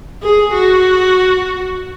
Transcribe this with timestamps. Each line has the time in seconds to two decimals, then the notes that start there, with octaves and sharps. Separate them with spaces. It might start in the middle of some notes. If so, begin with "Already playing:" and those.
0.23 G#4
0.53 F#4